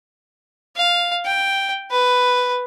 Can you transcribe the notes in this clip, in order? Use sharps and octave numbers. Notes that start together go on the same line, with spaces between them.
F5
G5
B4